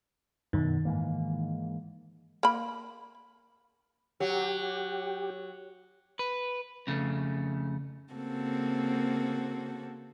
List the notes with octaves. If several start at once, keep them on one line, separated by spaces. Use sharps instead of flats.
F#2 B2 D#3
G#2 E3 A#3
A#3 B5
F#3 G4
B4
F2 C#3 A3
C#3 A#3 C4 F#4 A4